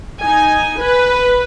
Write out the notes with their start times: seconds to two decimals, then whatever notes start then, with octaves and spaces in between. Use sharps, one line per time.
0.21 D#4 G#5
0.79 B4